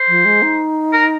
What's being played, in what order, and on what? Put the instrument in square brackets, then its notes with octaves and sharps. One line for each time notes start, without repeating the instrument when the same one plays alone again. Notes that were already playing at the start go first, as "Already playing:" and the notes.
Already playing: [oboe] C5
[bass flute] F3
G#3
D#4
[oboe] A#4